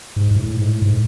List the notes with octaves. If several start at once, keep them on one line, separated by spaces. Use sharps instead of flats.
G#2
G#2
A2
G#2
A2
G#2